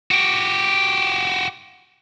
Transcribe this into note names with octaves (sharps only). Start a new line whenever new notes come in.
F#4 G4